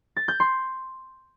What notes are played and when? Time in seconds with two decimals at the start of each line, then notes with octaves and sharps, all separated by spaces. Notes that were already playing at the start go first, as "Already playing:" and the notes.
0.17 A6
0.28 G6
0.40 C6